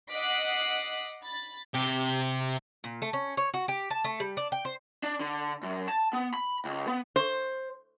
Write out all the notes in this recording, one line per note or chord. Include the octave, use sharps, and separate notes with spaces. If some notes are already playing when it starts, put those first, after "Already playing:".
D#5 F#5 D6 F#6 B6 C7
B5 A6
C3 G4
A#2
A3
C#4
C#5
F#4
G4
A5
A3
G3
D4
G5
C5
D4
D3
F#2
A5
B3
B5
C#2
B3
C5